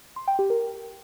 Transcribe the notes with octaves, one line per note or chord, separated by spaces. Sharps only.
C6
G5
G4
A#4